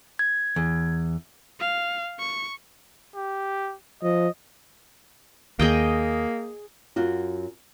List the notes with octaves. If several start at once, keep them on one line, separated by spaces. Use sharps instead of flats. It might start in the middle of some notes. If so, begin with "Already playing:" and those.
G#6
E2
F5
C#6
G4
F3 D#5
D#2 A#3 G#4 D#5 G5
F#2 F4 F#4